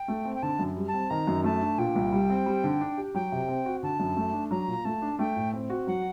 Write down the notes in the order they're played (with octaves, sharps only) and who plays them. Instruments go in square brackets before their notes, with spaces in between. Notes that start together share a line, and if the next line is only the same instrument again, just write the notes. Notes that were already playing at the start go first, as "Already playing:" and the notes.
Already playing: [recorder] G5
[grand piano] A3
C4
[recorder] G5
[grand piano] D3 [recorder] A5
[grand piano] F#2
G3
[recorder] A5
[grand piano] C4
[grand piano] D#3 [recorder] A#5
[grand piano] F#2
[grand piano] A3 [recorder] A5
[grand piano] D4
[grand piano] A#2 [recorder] G5
[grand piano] C2
G3
C4
G3
D3
D4
G4
[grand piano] F#3 [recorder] G5
[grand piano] C3
C4
F#4
[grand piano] D3 [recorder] A5
[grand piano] F#2
A3
D4
[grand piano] F#3 [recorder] A#5
[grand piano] A#2
[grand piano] A3 [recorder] A5
[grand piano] D4
[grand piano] A3 [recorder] G5
[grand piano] A2
C4
F#4
[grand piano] F#3 [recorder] F#5